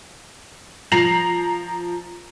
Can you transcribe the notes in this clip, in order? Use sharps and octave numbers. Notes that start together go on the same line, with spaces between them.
F3 A#5 A#6 C7 F7 F#7